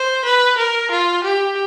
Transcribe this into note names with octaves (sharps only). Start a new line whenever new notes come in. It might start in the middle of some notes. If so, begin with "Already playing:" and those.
Already playing: C5
B4
A#4
F4
G4